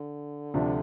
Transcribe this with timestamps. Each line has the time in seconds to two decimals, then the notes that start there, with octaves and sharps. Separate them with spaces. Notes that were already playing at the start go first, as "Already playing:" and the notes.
Already playing: D3
0.54 D2 C3 F3 D4 F4